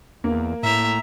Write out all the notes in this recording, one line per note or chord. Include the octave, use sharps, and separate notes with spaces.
E2 A#3
A2 E5 A#5